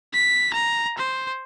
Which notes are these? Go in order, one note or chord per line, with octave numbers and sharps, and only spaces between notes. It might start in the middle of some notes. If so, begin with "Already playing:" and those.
B6
A#5
C5